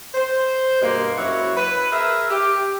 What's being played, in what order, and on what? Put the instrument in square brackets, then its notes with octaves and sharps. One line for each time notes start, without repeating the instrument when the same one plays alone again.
[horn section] C5
G2 B2 G#3 A#3
F#2 E4 F#4 C#5
B4
G#4 A#4 E5
G4